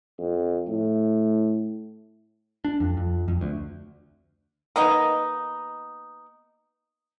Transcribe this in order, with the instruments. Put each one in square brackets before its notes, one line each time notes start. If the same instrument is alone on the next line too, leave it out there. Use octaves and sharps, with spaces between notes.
[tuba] F2
A2
[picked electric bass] D4
F2
F2
F2
D2
[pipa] A#3 B3 D#4